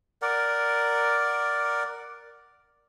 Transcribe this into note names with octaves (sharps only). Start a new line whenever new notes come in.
A#4 D5 F#5